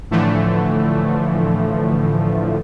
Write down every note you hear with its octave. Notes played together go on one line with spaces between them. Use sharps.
A2 D3 E3 F3 A3